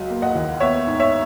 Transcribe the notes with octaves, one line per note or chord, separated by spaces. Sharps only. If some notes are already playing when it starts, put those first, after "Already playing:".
Already playing: C#2 F#3
A#3
D#5 F#5
D#2
B3 C#5 E5
G#2
C#5 E5